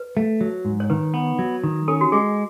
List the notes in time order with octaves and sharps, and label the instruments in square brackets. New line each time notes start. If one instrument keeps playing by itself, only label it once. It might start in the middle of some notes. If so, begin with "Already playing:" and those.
Already playing: [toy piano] B4
[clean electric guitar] A3
F#3
G#2
[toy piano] C#5
[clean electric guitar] D#3 [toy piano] B4
[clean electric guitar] B3
F#3
D#3
[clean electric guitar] C#4 [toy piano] A4
[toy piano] F#4
[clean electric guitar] G#3 [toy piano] G#4